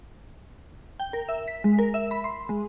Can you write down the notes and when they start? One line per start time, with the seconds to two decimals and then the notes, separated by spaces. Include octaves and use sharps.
1.00 G5
1.13 A#4
1.29 E5
1.48 B6
1.64 G#3
1.79 A#4
1.94 E5
2.11 B5
2.24 C6
2.49 G#3